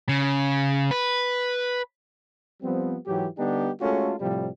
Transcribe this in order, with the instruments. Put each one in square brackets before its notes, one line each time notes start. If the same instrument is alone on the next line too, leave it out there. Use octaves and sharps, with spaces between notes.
[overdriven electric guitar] C#3
B4
[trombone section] F3 G3 B3 C4
G#2 E3 F#3 G4
D3 G3 B3 D4 D#4 G4
G#3 A3 C#4 F4 F#4 A4
A2 C3 F3 G3